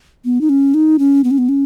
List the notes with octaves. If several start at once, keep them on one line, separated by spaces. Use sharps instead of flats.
B3
D#4
C#4
D#4
C#4
B3
C#4
B3
C#4